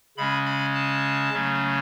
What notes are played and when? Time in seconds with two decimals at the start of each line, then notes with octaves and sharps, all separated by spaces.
0.17 C#3 G#3 C#4 B5
0.46 B5
0.75 A5
1.33 C#3 F#3 A3 C#4